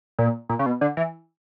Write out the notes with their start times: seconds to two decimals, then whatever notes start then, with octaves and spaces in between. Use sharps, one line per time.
0.19 A#2
0.49 A#2
0.59 C#3
0.66 B2
0.81 D3
0.97 E3